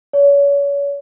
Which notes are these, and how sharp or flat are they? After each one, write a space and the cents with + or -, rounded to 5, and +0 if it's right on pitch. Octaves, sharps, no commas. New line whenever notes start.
C#5 +35